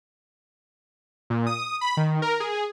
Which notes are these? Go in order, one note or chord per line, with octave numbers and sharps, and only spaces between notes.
A#2
D#6
B5
D#3
A#4
G#4